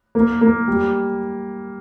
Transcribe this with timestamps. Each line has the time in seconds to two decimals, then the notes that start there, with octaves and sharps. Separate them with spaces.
0.15 A#3
0.41 A#3
0.68 G3